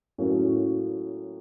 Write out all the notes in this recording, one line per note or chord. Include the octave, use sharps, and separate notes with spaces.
A2 F#3 A#3 C#4 F#4